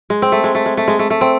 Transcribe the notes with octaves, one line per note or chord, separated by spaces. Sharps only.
G#3
C4
A3
G#3
A3
G#3
A3
G#3
A3
A3
C4